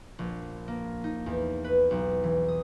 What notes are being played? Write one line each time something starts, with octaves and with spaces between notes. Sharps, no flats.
A#1
A#3
D#4
E2
B4
B1
E3
D#6